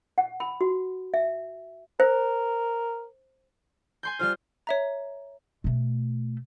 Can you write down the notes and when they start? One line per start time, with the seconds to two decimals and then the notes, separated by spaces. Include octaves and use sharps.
0.18 F#5
0.40 B5
0.61 F#4
1.14 E5
2.00 A#4 C5
4.03 G#5 C6 G6
4.19 G3 F4 C5 F6
4.67 C#5 E5 A#5
5.64 B2 A3